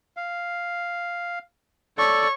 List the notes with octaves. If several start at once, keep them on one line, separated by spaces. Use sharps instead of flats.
F5
A4 C#5 D5 C#6